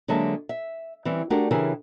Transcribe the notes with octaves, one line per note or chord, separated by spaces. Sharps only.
D3 F#3 G#3 A#3 E5 A5
E5
E3 G3 C4 C#4
A3 D4 F#4 G4 A#4
C#3 E3 E4 G4 G#4 A#4